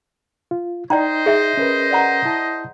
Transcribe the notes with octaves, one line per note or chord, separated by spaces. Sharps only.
F4
D#4 C5 D5 D#5 G5 A#5
G#4 E5
C#4 A#4 B4
D5 F#5 A#5
E4 A5